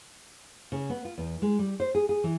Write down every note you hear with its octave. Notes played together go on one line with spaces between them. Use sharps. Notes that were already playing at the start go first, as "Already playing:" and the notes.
C#3
B3
F4
E2
G#3
G3
C5
G#4
G#4
E3